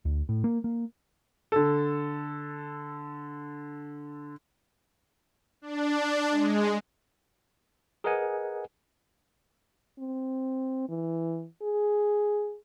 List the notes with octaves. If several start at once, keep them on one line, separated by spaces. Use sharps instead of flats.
D2
A2
A#3
A#3
D3 A4
D4
G#3
G#4 A#4 B4 D#5 F#5 G#5
C4
E3
G#4